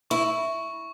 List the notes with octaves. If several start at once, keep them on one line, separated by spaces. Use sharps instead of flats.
E4 C#6